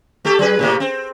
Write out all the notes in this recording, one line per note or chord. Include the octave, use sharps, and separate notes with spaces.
A3 G4 A4
F#3 G#4 B4
A2 C3 A#3
C4